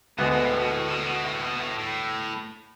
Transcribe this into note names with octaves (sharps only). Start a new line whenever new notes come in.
D2 B2 D3 G#3 B3
B2
A2
B2
A2
B2
A2
B2
A2
B2
A2
A2